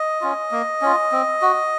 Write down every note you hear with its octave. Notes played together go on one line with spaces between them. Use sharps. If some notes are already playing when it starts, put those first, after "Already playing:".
Already playing: D#5
C#4 F4
A#3
C#4 F4
C4
F#4